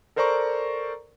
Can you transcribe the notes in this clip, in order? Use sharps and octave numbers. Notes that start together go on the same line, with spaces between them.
A4 A#4 C5 D5 A#5 C#6